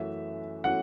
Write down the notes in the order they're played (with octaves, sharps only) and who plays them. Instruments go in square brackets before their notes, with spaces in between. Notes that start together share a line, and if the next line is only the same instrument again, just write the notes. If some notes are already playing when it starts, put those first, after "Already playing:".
Already playing: [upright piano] F#2 E3 A3 C#4 F#4 [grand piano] E5
[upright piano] E3 A3 C#4 F#4 [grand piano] F#5